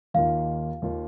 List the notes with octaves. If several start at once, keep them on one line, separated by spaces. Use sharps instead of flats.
D#2 D#3 A#3 F4 F5
D#2 D#3 A#3 F4